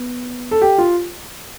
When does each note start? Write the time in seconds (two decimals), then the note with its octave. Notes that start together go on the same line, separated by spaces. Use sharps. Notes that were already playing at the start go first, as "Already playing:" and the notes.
Already playing: B3
0.51 A4
0.62 G4
0.78 F4